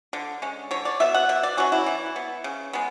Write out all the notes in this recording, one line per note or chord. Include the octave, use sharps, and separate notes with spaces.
D3
G#3 C#4
D3 C#5
D5
F#3 B3 E5
F#5
B2 E5
D5
F#3 C#4 F#4
E4
E3
B3
C#3
G#3 B3